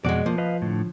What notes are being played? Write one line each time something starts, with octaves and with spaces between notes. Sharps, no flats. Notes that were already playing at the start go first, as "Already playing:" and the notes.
F2 B2 G#3 F#4 D5
F3 A#3
B4 D#5 F5
A2 D3